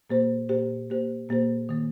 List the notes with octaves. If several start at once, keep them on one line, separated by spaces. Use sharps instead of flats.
A#2 A#3 G4 C5
A#2 A#3 G4 C5
A#2 A#3 G4 C5
A#2 A#3 G4 C5
D#3 A#3